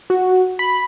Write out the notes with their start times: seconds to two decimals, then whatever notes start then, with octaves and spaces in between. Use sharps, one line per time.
0.10 F#4
0.59 B5